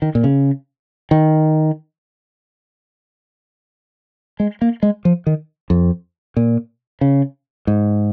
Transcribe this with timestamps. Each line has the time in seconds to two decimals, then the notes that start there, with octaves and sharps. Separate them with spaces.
0.02 D#3
0.15 A#2
0.24 C#3
1.11 D#3
4.40 G#3
4.62 A#3
4.83 G#3
5.05 F3
5.27 D#3
5.70 F2
6.37 A#2
7.01 C#3
7.67 G#2